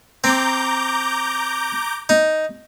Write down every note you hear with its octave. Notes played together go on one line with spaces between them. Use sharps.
C4 A#5 D6 G6
D#4